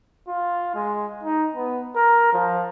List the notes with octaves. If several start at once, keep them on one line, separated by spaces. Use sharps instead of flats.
F4
G#3
D#4
B3
A#4
F3